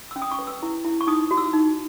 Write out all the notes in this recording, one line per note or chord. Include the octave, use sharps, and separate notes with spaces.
C#4 E6
D#6
C#6
B4
E6
E4
E4
C#6
D#4 D#6
F#4
E6
D#4